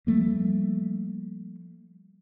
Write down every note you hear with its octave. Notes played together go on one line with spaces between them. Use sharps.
F3 G3 A3 A#3